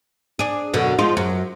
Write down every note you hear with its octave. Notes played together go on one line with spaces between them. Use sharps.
D4 G#4
F#2 B2 D3
F3 G#3 F4
F#2